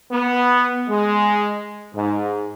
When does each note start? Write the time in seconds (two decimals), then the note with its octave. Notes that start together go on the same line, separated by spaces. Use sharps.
0.11 B3
0.89 G#3
1.94 G#2